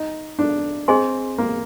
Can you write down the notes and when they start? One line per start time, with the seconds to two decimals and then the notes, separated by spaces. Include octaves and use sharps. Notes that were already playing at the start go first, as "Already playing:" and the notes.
Already playing: D#4
0.39 D4
0.88 C4 G#4 D#5 G#5 C6
1.38 A#3